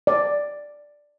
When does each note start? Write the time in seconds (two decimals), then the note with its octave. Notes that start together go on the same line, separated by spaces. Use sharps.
0.07 D5